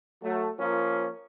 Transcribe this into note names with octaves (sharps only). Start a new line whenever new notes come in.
F#3 A3
F3 A#3 C#4 F4 A#4